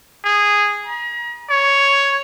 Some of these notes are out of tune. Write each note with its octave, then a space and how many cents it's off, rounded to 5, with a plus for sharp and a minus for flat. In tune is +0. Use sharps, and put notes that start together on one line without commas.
G#4 -10
A#5 +40
C#5 +5